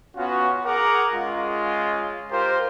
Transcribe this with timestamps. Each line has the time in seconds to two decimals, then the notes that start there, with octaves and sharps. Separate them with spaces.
0.17 B3 C#4 F4 F#4
0.65 G#4 A#4 F#5 A#5 D6
1.13 G#3 C#4 F4
2.30 F4 G4 A#4 C5